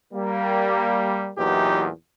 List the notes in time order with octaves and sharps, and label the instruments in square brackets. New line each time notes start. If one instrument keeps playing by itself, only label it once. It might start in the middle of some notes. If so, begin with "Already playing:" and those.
[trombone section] G3 A#3
E2 A#2 E3 F#3 D#4 G4